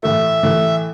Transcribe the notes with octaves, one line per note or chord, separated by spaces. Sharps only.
A2 E3 A3 E5
A2 E3 A3